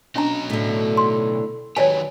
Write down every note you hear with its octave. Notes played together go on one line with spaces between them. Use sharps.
B2 F#3 C#4 D4 D#5 A#5
A2 D3
C6
D#3 F#3 G4 B4 C#5 D5 G#5